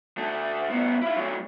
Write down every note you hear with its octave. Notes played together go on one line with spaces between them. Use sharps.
D2 A3
A2 B3
E4 F4
F#3 A3